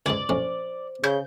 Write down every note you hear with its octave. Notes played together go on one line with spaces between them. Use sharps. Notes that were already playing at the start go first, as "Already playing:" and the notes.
C#2 G#2 D5
A#1 A2 C#4 C5
C#3 G6